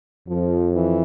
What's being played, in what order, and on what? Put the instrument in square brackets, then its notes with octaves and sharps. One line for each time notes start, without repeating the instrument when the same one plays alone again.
[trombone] F2 [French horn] F3
[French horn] E3